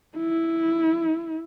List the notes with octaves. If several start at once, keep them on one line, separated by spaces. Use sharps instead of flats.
E4